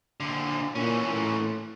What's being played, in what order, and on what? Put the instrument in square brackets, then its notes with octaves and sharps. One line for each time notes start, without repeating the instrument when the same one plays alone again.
[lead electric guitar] A#2 D3
[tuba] A#2 [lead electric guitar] E3 C#4
[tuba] A2